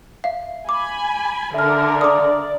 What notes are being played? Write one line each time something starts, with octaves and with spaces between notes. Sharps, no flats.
E5 F5
G#5 B5 D6
D3 A#4 E5 F6
D5 D6 D#6